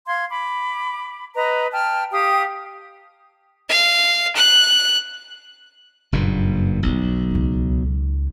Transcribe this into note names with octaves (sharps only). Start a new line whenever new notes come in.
F5 C6 G#6
B5 D6
B4 D#5 A#5
G5 A5 F6
G4 F5 G5 D#6
F5
F#6
F#1 G2 A#2
B1 D3 G3
C#2 D#4